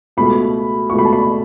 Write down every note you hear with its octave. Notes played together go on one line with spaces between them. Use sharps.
C#2 B2 A3 B5
C#2 B2 A3 C#6
B5
A5
B5